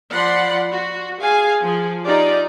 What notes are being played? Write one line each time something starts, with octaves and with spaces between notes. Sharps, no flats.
F3 D5 F#5 B5 C6
F#4
G#4 F5 G#5
F3 G#4
D#4 F4 G4 D5